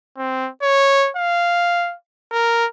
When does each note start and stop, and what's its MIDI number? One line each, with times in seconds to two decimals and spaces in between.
0.18 0.49 60
0.62 1.09 73
1.17 1.94 77
2.32 2.66 70